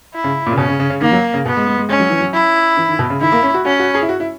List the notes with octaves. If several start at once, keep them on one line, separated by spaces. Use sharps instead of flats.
E4
C#3
A#2
C#3
B2 C#4
C#3
C#3
C#3
D#3 A#3
F#3
C#3
B2 B3
G#3
G#3
G#3
G#3 C#4
F#3
E3
F#3
E4
E3
D#3
B2
C#3
D#3 E4
A#3
C#4
F#4
C#4 F#4
F#4
G#4
E4
F#4
E4